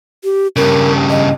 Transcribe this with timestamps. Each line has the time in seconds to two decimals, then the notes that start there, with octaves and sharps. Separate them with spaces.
0.24 G4
0.56 G2 C#3 A#4
1.10 D#5